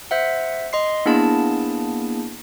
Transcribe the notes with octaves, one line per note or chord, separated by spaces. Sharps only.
C5 E5 F#5
D#5 C6 C7
A#3 B3 D4 E4 G#4 A5